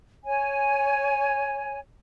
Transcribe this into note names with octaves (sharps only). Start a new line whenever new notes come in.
C#5 G#5